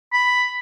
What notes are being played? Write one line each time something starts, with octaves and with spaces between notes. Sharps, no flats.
B5